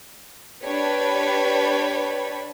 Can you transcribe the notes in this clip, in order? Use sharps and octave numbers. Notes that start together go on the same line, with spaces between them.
D4 G4 B4 C#5 B5